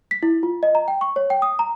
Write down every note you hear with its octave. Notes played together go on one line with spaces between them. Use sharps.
B6
E4
F4
D#5
A#5
G5
C#6
C#5
G5
D#6
A#5